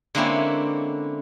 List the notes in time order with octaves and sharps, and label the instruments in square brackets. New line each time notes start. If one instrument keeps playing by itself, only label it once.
[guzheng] D3 G#3 A#3 C4 C#4 E4